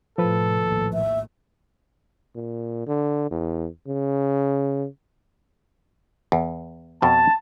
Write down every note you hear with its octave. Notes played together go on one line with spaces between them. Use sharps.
A2 C3 F3 A4 B4
A#1 D#2 A2
E5
A#2
D3
E2
C#3
E2
F2 B2 A5